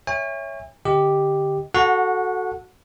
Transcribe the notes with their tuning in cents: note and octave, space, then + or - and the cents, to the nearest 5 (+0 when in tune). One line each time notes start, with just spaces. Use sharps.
C#5 +0 E5 +0 G#5 -45
D3 +0 G4 +0 D#5 +0
F#4 +0 A4 -5 F#5 -25